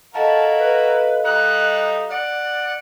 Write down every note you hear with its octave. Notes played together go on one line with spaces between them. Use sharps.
E4 F#4 A4 A#4 D#5 F5 A5
B4
G3 D#4 F#6
D5 F#5